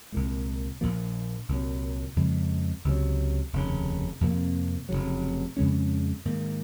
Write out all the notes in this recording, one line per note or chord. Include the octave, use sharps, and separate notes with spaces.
C2 A#2 G#3
A#1 A#2 F3 A#3
C2 A#2 F#3
F2 C#3 F3 G#3
C#2 C3 F#3
F1 D#2 C#3
F2 C3 F3 A#3
F1 D#2 C#3 F#3
F2 C#3 G#3 C#4
G#2 D#3 A#3